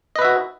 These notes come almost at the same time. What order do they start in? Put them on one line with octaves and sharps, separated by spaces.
D#5 B4 E5 F#4